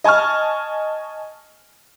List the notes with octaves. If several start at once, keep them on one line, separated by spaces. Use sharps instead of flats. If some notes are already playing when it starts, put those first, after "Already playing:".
D#5 G#5 A5 C#6 F6